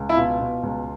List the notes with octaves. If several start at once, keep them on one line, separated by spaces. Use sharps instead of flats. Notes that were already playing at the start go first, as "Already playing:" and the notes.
Already playing: C#2
E4
B2 F4
B2
C#2